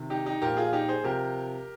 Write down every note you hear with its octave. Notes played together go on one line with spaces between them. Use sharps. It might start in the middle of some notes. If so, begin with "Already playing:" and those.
Already playing: C3 D#3
D#4 G4
D#4 G4
A#2 F3 G4 A#4
F4 G#4
D#4 G4
G#4 C5
C3 F3 G4 A#4